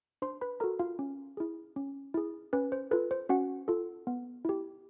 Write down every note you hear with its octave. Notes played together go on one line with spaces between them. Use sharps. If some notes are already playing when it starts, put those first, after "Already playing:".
D4 C5 C6
B4 B5
F#4 A4 A#4 A#5
F4 F5
C#4
E4 G#4
C#4
E4 G#4
C#4 B4
C5
F4 A4 B4
C5
C#4 F#4 F#5
F4 A4
B3
E4 G4